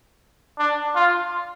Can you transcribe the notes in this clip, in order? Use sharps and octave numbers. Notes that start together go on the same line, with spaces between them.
D4
F4